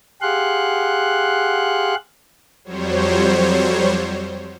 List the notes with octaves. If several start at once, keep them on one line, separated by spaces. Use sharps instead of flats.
G4 G#4 F5 F#5 C6 F#6
F2 F#3 G3 C5 C#5